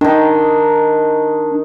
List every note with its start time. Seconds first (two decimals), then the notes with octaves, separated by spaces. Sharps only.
0.01 D#3 D4 D#4